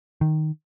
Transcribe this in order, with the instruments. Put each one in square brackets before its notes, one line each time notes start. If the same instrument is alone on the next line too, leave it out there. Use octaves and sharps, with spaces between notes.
[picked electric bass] D#3